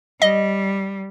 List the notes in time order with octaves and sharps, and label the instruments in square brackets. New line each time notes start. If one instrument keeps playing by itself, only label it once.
[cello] G3 [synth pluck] D#5